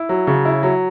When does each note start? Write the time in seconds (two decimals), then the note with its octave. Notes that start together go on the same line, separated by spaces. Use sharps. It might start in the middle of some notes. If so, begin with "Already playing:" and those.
Already playing: E4
0.09 F#3
0.27 C#3
0.45 E4
0.63 F#3